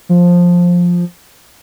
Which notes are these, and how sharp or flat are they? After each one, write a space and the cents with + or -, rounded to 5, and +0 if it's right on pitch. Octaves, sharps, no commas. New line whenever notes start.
F3 +10